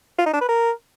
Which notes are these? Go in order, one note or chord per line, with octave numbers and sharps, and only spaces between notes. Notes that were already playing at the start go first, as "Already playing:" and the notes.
F4
D#4
D4
B4
A#4